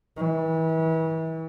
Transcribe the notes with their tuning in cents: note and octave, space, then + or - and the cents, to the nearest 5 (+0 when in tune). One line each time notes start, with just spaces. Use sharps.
E3 -35